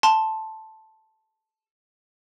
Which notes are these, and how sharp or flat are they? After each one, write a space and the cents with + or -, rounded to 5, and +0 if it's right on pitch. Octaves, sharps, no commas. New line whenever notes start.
A5 +0 C6 +0